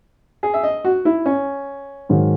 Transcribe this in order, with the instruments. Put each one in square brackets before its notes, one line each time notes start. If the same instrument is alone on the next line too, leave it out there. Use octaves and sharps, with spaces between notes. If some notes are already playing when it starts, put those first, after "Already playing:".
[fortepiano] G#4
E5
D#5
F#4
E4
C#4
[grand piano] G#2 D#3 F#3